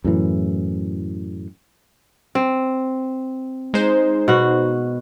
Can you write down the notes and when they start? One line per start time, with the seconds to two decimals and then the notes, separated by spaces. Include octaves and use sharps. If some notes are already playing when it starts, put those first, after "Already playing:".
0.04 F#2 A2 E3
2.35 C4
3.74 G#3 D#4 C5
4.28 B2 F#4